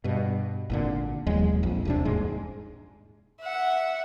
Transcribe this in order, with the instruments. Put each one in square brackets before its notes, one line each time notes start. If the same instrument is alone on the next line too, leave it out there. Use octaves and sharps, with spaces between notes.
[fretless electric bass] G2 B2
G#1 A#2 D3
E1 D#2 F#3 G#3
A#1 F2
D#1 C3 D4
D#1 G#2 G#3
[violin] E5 F#5